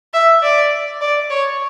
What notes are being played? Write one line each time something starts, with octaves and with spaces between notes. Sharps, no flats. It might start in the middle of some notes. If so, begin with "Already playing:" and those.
E5
D5
D5
C#5